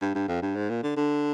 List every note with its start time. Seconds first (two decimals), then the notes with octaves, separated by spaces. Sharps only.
0.02 G2
0.15 G2
0.28 F2
0.42 G2
0.56 G#2
0.70 A#2
0.83 D3
0.97 D3